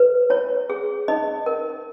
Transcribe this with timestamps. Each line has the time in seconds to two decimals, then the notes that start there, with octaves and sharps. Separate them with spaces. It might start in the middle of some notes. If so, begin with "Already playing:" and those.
Already playing: B4
0.30 E4 C#5
0.70 G#4
1.08 D#4 D#5
1.46 A#4